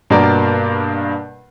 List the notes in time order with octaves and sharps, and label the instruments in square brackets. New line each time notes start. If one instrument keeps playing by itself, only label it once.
[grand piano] G2 B2 A#3 A#4 D5